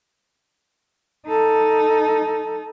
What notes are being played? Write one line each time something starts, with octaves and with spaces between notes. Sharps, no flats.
D#4 A4